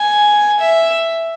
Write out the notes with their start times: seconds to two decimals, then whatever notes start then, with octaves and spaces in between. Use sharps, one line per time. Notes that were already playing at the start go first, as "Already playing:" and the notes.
Already playing: G#5
0.60 E5